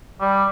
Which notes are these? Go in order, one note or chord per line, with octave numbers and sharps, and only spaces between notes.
G3